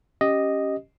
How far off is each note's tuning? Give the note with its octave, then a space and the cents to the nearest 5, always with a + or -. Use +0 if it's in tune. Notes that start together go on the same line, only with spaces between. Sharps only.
C#4 +0 G4 +0 D#5 +0